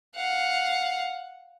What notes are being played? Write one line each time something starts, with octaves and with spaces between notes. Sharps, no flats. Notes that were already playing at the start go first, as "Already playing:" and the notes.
F5 F#5